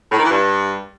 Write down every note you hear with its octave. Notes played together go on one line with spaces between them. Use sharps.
A2
D#3
E3
G2